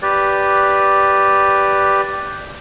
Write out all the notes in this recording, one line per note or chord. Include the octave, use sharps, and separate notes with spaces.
G4 B4 D5